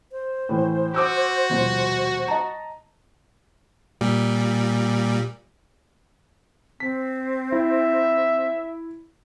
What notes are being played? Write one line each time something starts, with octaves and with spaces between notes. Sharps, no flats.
C5
A2 E3
F#4 D6 E6 G6
D#1 B2 F3
D#5 A5 A#5
A#2 G3
C4 B6
E4 E5